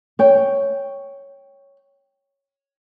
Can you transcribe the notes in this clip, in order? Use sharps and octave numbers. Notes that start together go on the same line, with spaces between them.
C#5 G5